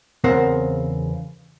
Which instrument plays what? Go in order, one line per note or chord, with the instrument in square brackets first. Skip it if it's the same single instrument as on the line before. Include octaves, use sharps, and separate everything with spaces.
[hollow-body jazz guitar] E2 C#3 C4 A#4 C5 F#5